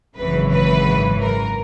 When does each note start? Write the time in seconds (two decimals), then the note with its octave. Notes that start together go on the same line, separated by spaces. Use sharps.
0.16 G#1 F#2 C#3 E3 B4
0.51 B4
1.20 A#4